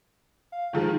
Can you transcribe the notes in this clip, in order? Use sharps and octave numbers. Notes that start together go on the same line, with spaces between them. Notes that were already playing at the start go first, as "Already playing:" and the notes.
F5
D#3 F3 G#3 D#4